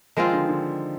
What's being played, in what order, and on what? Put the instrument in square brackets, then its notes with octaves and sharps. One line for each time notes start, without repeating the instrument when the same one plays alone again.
[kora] D#3 G#3 C4 F4 [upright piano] F3
[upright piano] D3
D3